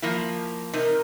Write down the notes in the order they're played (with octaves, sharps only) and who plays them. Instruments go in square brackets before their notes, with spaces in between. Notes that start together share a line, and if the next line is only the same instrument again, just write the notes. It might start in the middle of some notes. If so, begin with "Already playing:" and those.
[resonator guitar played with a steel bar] F3 A#3 E4
[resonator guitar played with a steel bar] C3 D#4 [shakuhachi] A#4